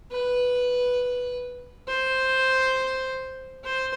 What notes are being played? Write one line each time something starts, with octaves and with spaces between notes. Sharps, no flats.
B4
C5
C5